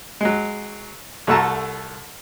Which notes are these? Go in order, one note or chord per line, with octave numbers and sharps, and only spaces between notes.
F#3 G#3
C2 A3 F#4 A4 A5 A#5